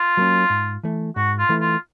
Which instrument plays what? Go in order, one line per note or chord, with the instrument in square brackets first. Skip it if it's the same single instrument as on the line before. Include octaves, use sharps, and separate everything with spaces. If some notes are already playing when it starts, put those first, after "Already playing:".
Already playing: [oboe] F4
[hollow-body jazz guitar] F#3 A#3 C#4
G#2
E3 A3
[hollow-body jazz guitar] G#2 [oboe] F#4
[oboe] F4
[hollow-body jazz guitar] E3 A3
[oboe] F4